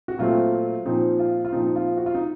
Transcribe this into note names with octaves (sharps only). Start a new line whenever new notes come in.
F#4
A#2 F#3 A3 C4 F4
A#2 F3 C4 D#4
F4
F4
A#2 F3 C4 D#4
D#4
F4
F#4
F4
D#4